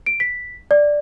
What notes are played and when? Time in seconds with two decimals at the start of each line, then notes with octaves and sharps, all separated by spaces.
0.06 D7
0.20 B6
0.71 D5